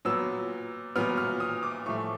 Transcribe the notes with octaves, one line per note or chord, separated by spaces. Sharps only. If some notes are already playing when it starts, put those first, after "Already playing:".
A#2 F#3 B3 E6
A#2 F#3 B3 F6
F6
D#6
D6
A2 F3 A3 C#6